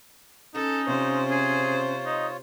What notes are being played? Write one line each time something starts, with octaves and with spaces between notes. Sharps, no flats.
C#4 D#4 A4
C3 F4 C5 C#5
G#4
D#4 D#5